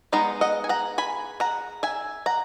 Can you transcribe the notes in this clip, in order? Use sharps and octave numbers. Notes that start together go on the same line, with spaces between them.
G#3 B3 D#4 F#5 A#5
D#5 F#5
G#5
F#5 A#5
G#5 B5
F#5 A#5
E5 G#5
F#5 A#5